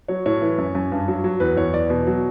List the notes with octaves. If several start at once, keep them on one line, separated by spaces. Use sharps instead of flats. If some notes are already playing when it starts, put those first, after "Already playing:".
F#3 C#5
A2 C#5
E3
F#2
F#2
G2
F#3
F#3
E2 B4
E2 C#5
E2 D5
B2
F#3